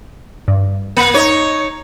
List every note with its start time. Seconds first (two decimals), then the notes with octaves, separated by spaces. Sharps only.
0.48 G2
0.97 A#3
1.14 D#4 C#5